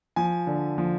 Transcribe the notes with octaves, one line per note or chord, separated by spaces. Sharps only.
F3 G#5
D3
F3